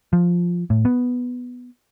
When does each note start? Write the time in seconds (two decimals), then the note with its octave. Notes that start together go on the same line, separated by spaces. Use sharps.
0.13 F3
0.70 A2
0.85 B3